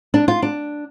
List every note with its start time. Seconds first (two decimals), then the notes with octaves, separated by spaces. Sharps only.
0.14 D4
0.28 F4
0.42 D4